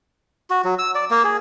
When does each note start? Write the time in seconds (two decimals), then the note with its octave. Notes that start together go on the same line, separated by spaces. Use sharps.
0.50 F#4
0.64 F#3
0.79 E6
0.95 D5
1.10 A#3
1.24 G#4